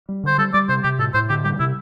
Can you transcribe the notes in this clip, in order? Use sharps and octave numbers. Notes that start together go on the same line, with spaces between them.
G3
D3 C5
G3 A4
G3 D5
C3 C5
C3 G4
A2 A4
A2 C5
D3 G4
G3 G4
C3 E4